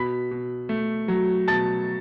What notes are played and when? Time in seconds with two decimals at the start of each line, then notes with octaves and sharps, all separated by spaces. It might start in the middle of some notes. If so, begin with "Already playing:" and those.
Already playing: B2 B5 B6
0.31 B2
0.69 A3
1.08 F#3
1.47 B2 A5 A6